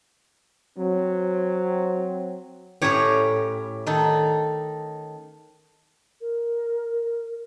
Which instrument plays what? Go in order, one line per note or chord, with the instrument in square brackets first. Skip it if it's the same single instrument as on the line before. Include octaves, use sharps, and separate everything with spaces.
[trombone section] F#3 C4
[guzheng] A2 G4 [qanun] C#4 C#5 A#5
[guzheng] D#3 D#4 A4
[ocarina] A#4